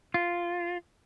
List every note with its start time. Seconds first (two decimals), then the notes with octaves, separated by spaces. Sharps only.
0.14 F4